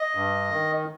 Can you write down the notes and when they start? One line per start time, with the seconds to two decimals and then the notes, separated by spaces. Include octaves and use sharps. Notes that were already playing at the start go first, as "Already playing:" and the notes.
Already playing: D#5
0.15 G2
0.50 D#3